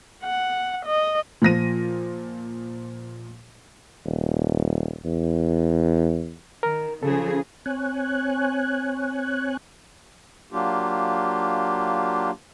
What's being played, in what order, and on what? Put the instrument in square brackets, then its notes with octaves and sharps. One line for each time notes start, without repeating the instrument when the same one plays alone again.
[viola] F#5
D#5
[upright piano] A#2 F3 A#6 D#7
[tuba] D#1
E2
[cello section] D#3 [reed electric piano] A#4
[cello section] C#3 F3 G#4 [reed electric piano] A4
[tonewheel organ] C4 C#5 G#5 F#6
[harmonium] F#3 A#3 D4 F4 G4